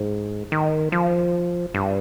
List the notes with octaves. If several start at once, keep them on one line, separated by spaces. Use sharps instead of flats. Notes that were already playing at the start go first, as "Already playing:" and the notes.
Already playing: G#2
D#3
F3
G2